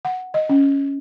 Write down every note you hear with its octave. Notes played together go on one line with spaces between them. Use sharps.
F#5
D#5
C#4